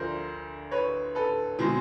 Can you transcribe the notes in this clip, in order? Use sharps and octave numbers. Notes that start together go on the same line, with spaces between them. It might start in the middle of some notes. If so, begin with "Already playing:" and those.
Already playing: D2 D3 F3 A#4 C5
B4 C#5
A4 B4
B2 G#3 C4